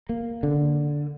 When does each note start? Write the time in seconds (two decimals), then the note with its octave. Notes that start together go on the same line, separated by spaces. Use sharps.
0.09 A#3
0.43 D3